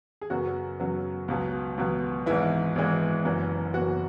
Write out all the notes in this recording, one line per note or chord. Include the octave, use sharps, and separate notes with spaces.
G#4
F#2 C#3 F#3 B3 F#4
F#2 C#3 F#3 B3
C#2 B2 F#3 B3
C#2 B2 F#3 B3
G#1 G#2 E3 G#3 B3 E4
G#1 G#2 E3 G#3 B3
F#1 F#2 E3 B3
F#1 F#2 E3 B3 F#4